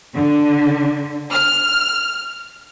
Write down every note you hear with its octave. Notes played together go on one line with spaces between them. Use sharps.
D3
F6